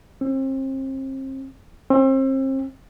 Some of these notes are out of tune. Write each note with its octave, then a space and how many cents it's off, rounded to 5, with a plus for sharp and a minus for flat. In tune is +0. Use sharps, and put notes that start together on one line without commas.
C4 +35
C4 +35